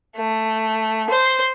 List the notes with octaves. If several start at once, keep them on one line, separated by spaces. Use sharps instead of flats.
A3
C5